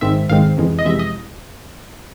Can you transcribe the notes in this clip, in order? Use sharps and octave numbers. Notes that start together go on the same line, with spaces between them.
G#1 G#2 D#3 G#3 C4 E5
G#1 G#2 D#3 G#3 C4 F5
F2 C3 E3 G#3
D#5
F2 C3 E3 G#3 E5
D#5